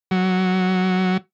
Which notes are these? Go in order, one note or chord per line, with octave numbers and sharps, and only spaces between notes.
F#3